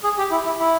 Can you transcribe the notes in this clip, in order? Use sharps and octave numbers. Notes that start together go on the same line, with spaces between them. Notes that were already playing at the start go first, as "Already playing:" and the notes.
G#4
G4
E4
E4
E4